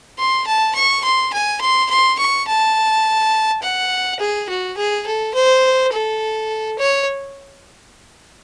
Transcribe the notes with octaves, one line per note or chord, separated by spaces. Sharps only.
C6
A5
C#6
C6
G#5
C6
C6
C#6
A5
F#5
G#4
F#4
G#4
A4
C5
A4
C#5